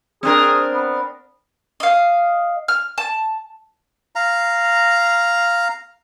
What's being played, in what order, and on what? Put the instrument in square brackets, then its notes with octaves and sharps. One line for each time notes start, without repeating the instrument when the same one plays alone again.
[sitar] C4 D4 A#4 [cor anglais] G#4
[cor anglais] B3
[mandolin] D#5 F5
F6
A5
[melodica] F5 A#5